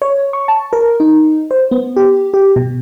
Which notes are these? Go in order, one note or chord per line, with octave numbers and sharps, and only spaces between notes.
C#5
C#6
A5
A#4
D#4
C5
B3
G4
G4
B2